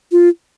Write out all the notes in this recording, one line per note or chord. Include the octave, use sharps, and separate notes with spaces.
F4